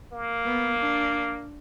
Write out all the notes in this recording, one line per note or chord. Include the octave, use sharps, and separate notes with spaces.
A#3
B3
D4